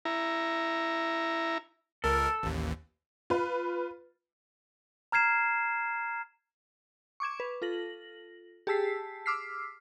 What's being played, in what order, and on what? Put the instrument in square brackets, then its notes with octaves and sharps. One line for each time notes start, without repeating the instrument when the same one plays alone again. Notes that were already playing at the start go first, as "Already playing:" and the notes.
[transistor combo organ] E4 A#5
[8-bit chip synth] C#2 A#4 [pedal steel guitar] A4
[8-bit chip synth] A1 D#2
[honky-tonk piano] F4 B4
[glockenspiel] A#5 F6 G#6 C7 E7
[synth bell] C#6 D6 G#6 E7
B4
F4 A4 A#6 F#7
G4 G#4 A5 E6 B6 C7
D6 E6 F6 B6 C7